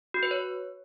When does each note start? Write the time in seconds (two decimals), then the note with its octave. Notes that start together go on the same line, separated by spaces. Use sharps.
0.14 F#4
0.23 B4
0.31 C#5